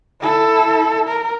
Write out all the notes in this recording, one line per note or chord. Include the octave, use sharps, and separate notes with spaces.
E4 A4
A#4